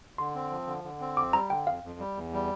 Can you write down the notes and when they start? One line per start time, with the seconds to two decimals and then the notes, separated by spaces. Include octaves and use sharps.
0.18 D3 C6
0.35 C4
0.51 F3
0.67 D3
0.84 D3
1.00 C4
1.17 F2 D6
1.33 G3 A#5
1.50 D3 G5
1.67 F2 F5
1.83 F2
1.99 G3
2.16 E2
2.33 G3